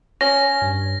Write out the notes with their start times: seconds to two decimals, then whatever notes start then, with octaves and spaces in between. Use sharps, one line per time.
0.21 C#4 A#6
0.62 G2